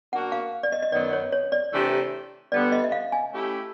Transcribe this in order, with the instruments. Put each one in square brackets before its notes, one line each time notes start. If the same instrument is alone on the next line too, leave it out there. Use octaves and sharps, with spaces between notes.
[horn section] A#3 D4 F#4 [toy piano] F#5
[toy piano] F5
D5
D#5
D#5
[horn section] F#2 D#3 F#3 B3 [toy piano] D5
[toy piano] C#5
C#5
D5
[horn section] C3 E3 A3 D4 G4
[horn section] D3 G3 B3 [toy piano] D5
[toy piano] D#5
E5
F5
G#5
[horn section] A3 C#4 E4 G4